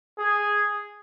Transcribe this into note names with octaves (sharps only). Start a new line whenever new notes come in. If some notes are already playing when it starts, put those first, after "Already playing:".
G#4